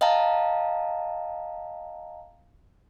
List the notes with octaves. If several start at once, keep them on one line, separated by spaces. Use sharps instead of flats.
D#5 F5 G5 A5 A#5